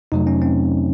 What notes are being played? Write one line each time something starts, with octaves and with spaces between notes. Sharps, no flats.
F2 C3 F#3 A3 D#4
C#4
C4